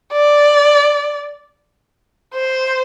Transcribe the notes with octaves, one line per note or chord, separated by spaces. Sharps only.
D5
C5